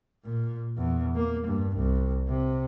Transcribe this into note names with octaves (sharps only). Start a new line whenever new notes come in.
A#2
E2
A#3
G2
C2
C3